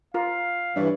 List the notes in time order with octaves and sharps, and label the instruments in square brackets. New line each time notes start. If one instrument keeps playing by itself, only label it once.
[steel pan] F4 A#4 [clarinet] F5
[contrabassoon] G2 [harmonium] E3 [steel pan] C#5 D5 E5